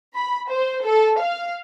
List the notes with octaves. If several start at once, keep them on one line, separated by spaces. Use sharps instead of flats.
B5
C5
A4
F5